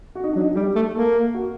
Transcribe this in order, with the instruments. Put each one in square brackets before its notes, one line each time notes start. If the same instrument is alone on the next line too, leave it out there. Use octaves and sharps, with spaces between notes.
[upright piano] F#4
D#4
D4
[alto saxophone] F#3
[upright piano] D#4
[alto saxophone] G3 [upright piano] G4
[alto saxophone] A3
[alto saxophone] A#3 [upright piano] A4
[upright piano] F#4